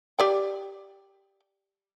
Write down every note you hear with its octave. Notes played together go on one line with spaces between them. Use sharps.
G4 D5 G5